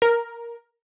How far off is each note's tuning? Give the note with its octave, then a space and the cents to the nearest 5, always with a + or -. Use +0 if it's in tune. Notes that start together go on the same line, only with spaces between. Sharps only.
A#4 +5